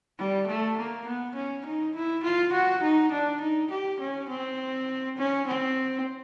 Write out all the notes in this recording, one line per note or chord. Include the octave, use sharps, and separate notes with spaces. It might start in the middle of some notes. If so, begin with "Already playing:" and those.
G3
A3
A#3
B3
C#4
D#4
E4
F4
F#4
D#4
D4
D#4
G4
C#4
C4
C#4
C4